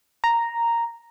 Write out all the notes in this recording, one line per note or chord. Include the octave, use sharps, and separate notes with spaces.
A#5